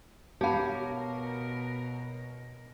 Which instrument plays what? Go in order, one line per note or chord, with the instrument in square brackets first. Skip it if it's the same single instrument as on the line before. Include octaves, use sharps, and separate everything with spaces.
[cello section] B2 A#4 [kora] G4 [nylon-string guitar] C#5 F5 [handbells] A5 B5